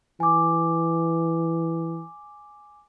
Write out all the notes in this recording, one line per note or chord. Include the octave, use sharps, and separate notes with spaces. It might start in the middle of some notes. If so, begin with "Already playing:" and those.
E3 G#5 D6